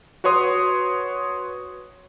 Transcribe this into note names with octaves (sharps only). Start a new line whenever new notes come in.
F#4 B4 C#5 C6 D#6